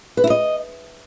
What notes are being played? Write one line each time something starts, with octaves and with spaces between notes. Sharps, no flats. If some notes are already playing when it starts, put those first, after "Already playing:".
B4
E4
D#5